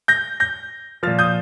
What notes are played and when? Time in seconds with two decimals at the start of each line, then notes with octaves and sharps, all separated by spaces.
0.08 G6 A#6
0.40 G6 A#6
1.03 F3 F6 A6
1.07 A#2
1.19 D#6 G6